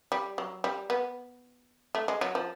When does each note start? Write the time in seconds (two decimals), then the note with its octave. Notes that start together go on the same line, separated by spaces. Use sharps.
0.12 G3
0.38 F#3
0.64 G3
0.90 B3
1.95 A3
2.08 G#3
2.21 F#3
2.35 F3